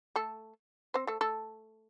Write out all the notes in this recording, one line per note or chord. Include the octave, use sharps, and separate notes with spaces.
A3 A4
C4 C5
A3 A4
A3 A4